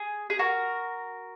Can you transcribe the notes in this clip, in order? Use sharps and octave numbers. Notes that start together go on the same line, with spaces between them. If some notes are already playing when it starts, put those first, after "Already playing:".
Already playing: G#4
G#4
F#4 A#4